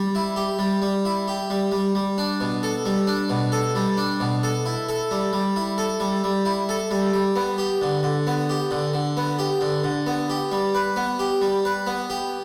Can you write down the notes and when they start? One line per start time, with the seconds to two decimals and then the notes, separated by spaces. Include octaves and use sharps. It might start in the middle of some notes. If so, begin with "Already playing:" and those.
Already playing: G3
0.15 E4
0.36 G4
0.59 G3
0.82 G3
1.05 E4
1.28 G4
1.50 G3
1.72 G3
1.95 G3
2.18 D4
2.41 B2
2.63 A4
2.86 G3
3.07 D4
3.30 B2
3.52 A4
3.75 G3
3.97 D4
4.20 B2
4.43 A4
4.65 E4
4.89 A4
5.11 G3
5.33 G3
5.56 E4
5.78 A4
6.00 G3
6.24 G3
6.45 E4
6.69 A4
6.91 G3
7.13 G3
7.36 B3
7.58 G4
7.81 D3
8.03 D3
8.27 B3
8.49 G4
8.71 D3
8.93 D3
9.17 B3
9.39 G4
9.61 D3
9.84 D3
10.07 B3
10.30 G4
10.52 G3
10.75 B4
10.96 B3
11.19 G4
11.42 G3
11.65 B4
11.87 B3
12.10 G4